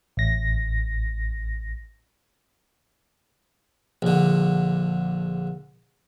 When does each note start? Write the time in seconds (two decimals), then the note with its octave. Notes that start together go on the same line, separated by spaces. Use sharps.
0.17 A1 A#6
4.02 A#1 D3